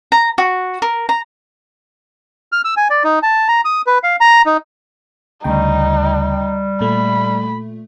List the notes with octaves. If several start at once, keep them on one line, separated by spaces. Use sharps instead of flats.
A#5
F#4
A#4
A#5
F6
E6
G#5
D5
D#4
A5
A#5
D#6
B4
F5
A#5
D#4
D2 C#3 G3 D#4 G5
A#2 A3 B5